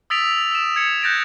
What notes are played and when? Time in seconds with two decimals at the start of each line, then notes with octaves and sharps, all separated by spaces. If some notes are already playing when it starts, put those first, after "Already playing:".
0.10 D#6 E6 A6 B6 D7 F7
0.52 E6 E7
0.76 G#6 C#7
1.02 F#6 G6 A6 A#6 D7 F7